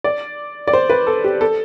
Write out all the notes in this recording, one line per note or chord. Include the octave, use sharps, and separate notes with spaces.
D5
D5
C5
B4
A4
G4
A4